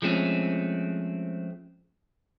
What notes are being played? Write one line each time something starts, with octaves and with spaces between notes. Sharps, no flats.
F3 G#3 A3 C4 C#4